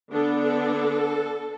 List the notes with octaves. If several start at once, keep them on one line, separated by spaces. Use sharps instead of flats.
D3 B3 D4 A4
A4